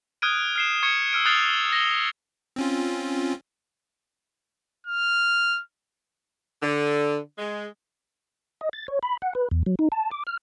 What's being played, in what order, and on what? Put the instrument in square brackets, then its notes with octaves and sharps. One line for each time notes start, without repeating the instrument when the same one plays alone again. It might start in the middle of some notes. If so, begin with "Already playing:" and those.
[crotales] D#6 F6 F#6 G#6 D7 D#7
F6 C7 E7
C#6 G#6 C#7
E6 F6 D7
D#6 F6 F#6 A6 C7 F7
A#6 G7
[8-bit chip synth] C4 C#4 F4
[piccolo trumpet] F6
[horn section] D3
G#3
[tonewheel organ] D#5
A6
C#5
B5
F#5
B4
E2
F#3
D#4
A5
D6
F6